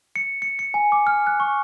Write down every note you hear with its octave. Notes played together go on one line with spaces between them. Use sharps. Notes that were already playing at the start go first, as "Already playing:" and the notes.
C#7
C#7
C#7
G#5
D6
F6
F#6
C#6